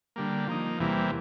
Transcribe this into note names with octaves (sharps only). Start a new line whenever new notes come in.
D3 G3 A#3
F3 A#3 D#4
E2 C3 E3 G3 A#3